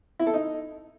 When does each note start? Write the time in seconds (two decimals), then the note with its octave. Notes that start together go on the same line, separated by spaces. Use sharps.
0.19 E4
0.26 A4
0.34 D#4